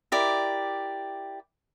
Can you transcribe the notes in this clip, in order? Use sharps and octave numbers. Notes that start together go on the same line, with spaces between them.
E4 G4 A#4 D5